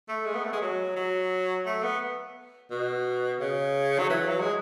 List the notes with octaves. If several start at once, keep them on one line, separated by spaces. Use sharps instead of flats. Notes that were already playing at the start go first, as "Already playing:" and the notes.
A3
G#3
B3
A3
G#3
F#3
F#3
A3
B3
B2
C#3
F#3
E3
F#3
G#3